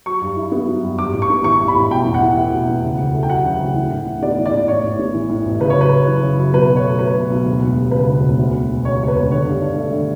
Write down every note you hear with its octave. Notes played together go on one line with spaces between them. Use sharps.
F#3 C#6
G2
E4
B3
F#3
G2
G2 D6
A1
C#6
B3
E3 C#6
G2
B5
A1
B2 G5
E2
F#5
E4
A3
B2
E2
C#3
D2
A3
G5
F#3 F#5
C#3
D2
E3
A2
A2
B3 D5
E3
D5
A2
A2 C#5
A1
B3
E3
A2
A1
C#3 B4
C#5
F#2 B4
F#2
E3
C#3
F#2
B2 B4
B1
C#5
A3
F#3 B4
B2
B1
D2
E1
G3
C#3 B4
D2
E1
D2
E1
E1
C#3 C#5
D2 C#5
B4
E1
D3 C#5
G2
D4
A3
D3